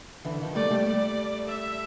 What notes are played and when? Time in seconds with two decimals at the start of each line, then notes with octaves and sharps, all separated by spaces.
0.25 D3 E3
0.41 D#3 F3
0.55 G3 A3 D5
0.70 G3 A3
0.86 G3 A3 D5
1.48 E5